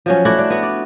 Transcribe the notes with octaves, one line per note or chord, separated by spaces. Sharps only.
F3 F#3 C#4
A3 E4 F#4 D5
D4
B3 F#4
D5